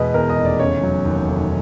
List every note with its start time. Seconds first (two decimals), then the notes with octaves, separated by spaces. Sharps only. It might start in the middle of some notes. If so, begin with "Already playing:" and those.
Already playing: E2 B2 G#3 B4 D#5
0.14 E2 A#4
0.29 D#5
0.37 F1
0.45 D5
0.59 C#3 C#5
0.83 F#3
1.06 D#2
1.28 F1